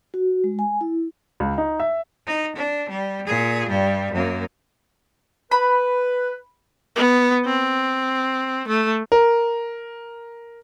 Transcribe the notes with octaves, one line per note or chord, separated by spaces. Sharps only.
F#4
G#3
G#5
E4
C#2
D#4
E5
D#4
D4
G3
A#2 G#4
G2 G3
F#2 A#3
B4 B5
B3
C4
A3
A#4